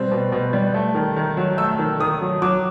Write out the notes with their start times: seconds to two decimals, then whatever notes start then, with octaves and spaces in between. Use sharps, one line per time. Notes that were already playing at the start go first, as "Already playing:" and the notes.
Already playing: B2 G3 C4
0.12 B2
0.32 B2
0.53 G3
0.74 A3
0.95 D#3
1.16 D#3
1.37 F#3
1.58 A3 E6
1.79 D#3
2.00 D#3 D#6
2.21 F#3
2.42 F#3 D6